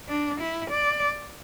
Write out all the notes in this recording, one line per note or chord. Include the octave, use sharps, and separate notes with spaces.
D4
E4
D5